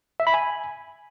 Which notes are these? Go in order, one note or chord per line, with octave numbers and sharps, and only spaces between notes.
E5
B5
G#5